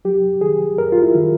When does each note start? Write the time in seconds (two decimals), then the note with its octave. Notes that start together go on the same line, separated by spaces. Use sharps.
0.05 F#3 G4
0.41 D#3 G#4
0.78 F#2 A#4
0.92 F4
1.02 E4
1.15 D#3